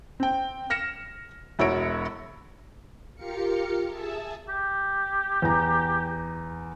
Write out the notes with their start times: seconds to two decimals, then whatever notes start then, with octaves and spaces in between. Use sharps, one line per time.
0.20 C4 G5
0.70 F6 A#6 C#7 E7
1.59 E1 E4 F#4 C#5 D7
3.15 F4 G4 A#4 F5 C#7
3.87 G#4 E5 A5
4.49 G4
5.42 E2 A#5